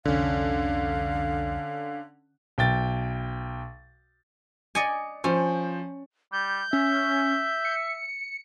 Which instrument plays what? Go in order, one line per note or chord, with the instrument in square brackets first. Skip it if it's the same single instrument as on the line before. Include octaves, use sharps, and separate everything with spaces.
[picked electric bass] C2 F2 [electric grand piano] D3 C#4 [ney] F5
[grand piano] B1 G5 A6
[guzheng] D5 D#5 G#5 [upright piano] C#7
[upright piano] F3 C5 [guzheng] C#4
[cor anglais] G3 [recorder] G6
[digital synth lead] C#4 [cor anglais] E5
[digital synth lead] C#7